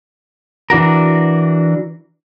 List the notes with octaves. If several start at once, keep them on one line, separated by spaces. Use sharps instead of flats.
E3 D4 F#4 A#4